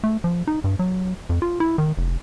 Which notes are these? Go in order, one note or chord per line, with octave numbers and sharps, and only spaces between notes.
A3
F3
D#4
G2
F#3
F2
F4
E4
D#3
F1